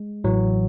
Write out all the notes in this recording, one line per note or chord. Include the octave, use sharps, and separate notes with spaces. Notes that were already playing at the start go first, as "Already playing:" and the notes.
Already playing: G#3
A1 A2 E3 F#3